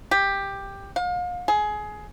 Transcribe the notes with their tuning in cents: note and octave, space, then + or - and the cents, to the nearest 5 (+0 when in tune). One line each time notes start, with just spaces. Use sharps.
G4 +10
F5 +35
G#4 +20